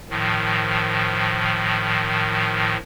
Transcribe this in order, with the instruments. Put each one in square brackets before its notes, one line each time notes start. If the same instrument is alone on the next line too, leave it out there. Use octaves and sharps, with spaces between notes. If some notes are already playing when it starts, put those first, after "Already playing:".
[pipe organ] A2 D#3 F3